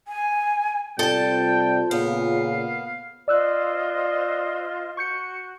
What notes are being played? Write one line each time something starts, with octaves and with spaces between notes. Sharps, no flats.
G#5
C3 G3 F4 A4 G5 A5
A#2 C#3 B3 F5
F4 C5 D5 D#5 E6 F#6
F#4 C#6 G6 C#7